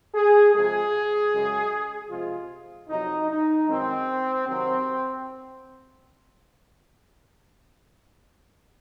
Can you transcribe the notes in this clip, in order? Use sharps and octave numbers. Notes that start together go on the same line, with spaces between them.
G#4
C3 F3 G#3 G#4
F#2 C#3 G#3
C3 F3 G#3 F4
F2 C3 F#3 D#4
D#4
F#2 D#3 G#3 C4
C3 D#3 F#3 C4